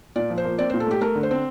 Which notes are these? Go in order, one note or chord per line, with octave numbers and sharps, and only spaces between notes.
A#2 D5
F3
C5
A#3
C4 D5
C5
A#2
A4
A3 G4
A3 A#4
D3
C5
C4